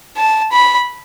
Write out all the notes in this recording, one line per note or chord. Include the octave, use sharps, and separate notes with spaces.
A5
B5